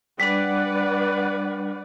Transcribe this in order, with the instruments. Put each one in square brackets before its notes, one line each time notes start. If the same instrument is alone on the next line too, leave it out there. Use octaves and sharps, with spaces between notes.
[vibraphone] G3 D4 [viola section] B4 D5 F#5